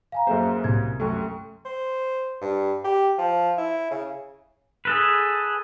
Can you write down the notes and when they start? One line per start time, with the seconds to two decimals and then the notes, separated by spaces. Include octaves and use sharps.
0.12 F5 G#5 A#5
0.27 F#2 A#3 G#4 A4 C5 E5
0.64 C2 G#6
1.00 F#2 A3 A4 G5 C#6
1.65 C5
2.41 G2
2.85 G4
3.18 F3
3.58 E4
3.91 C#3
4.85 G#4 A4 B4